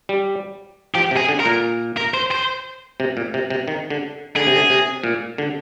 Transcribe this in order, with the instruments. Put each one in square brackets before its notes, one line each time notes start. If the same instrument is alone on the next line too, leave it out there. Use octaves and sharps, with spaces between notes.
[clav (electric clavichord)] G3
[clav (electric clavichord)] F3 [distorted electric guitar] G4
[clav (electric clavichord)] C3
[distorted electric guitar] G#4
[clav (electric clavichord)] D3
[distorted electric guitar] A#4
[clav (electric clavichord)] A#2
[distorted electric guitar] A#4
C5
C5
[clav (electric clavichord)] C3
A#2
C3
C3
D#3
D3
[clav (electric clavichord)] D3 [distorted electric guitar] G#4
[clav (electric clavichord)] C3
D3
C3
A#2
D3